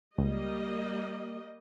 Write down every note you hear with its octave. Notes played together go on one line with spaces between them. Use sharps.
C#2 G3 A#3 D#5